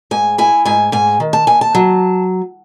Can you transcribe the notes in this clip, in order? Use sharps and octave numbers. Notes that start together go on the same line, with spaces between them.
G#2 G#5
E4 G#5
G#2 G#5
G#2 G#5
D#3
A5
D#2 G#5
A5
F#3